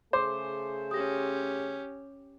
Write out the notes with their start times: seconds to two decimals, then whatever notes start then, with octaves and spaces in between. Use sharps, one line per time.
0.13 C#3 A3 G#4 C5 D6
0.91 C#4 G4 D#6 A#6